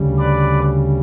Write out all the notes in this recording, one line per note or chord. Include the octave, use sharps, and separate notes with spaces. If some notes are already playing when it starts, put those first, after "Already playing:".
Already playing: D2 C#3 G3
B4 D5